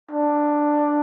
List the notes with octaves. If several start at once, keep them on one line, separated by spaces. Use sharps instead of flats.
D4